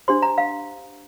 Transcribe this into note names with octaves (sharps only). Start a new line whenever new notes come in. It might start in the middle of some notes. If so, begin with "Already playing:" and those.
D4 G4 C5 C6
A#5
F5